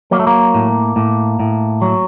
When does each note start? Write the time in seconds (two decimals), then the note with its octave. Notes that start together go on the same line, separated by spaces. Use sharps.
0.11 F#3 A#3
0.20 A3
0.27 A#3
0.54 A2
0.96 A2
1.40 A2
1.82 F#3